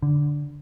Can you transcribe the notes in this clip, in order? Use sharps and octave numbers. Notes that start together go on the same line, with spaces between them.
D3